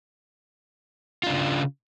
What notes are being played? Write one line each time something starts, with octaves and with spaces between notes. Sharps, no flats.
C#3 D4 F4